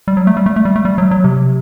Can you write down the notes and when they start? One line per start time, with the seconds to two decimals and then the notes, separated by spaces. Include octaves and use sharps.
0.08 G3
0.17 F#3
0.27 A3
0.37 G3
0.46 A3
0.56 A3
0.65 G3
0.76 A3
0.85 G3
0.98 F#3
1.11 F#3
1.24 C3